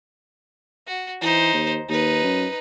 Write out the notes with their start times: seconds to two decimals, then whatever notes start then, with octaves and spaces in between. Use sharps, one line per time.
0.87 F#4
1.22 E3 D#4 C5
1.54 D#2
1.89 D#2 D#4 B4
2.24 F#2